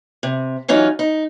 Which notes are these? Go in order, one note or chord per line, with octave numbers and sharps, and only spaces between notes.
C3
E3 F#3 C#4 D#4 F4
D#4